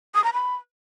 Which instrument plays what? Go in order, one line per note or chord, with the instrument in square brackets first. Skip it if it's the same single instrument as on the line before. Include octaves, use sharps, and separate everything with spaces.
[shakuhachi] D#6
A#5
B5